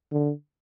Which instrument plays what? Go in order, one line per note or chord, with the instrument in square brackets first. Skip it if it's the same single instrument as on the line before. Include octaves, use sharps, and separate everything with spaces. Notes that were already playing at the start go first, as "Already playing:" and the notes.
[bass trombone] D3